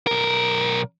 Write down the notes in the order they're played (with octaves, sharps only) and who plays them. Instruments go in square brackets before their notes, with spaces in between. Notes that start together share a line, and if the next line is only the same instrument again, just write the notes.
[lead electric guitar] B1 A#4